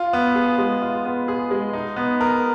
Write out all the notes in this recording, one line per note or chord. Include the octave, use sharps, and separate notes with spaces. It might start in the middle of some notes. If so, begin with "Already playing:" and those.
Already playing: F4
B3
G#4
G#3
F4
B3
G#4
G#3
D#4
B3
A#4